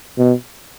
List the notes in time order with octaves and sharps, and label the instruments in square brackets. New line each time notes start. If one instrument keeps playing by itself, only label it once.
[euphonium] B2